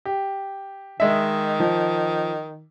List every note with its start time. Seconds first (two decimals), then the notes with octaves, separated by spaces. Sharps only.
0.05 G4
1.00 D#3 G#3 E5
1.60 F3